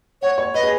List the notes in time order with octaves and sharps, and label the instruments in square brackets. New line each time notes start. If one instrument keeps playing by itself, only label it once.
[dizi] C#5 [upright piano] F#5
[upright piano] C#5
[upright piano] B4 [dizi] D#5
[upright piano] G#4